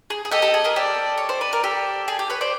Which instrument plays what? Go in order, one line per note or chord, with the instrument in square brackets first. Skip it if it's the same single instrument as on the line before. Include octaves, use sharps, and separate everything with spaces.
[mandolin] G#4
G#4
[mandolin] G4 A4 [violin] D#5
[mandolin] G4 A4
G#4
G#4 A#4
[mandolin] G4 A4 [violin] D5
[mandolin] C#5 [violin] D5
[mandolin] C5
B4
A#4
G4 A4
G#4
G4
B4 C#5
C5 D5